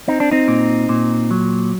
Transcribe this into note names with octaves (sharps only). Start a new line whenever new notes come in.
C4 D#4
D4
C4 D#4
A#2
A#2
F#3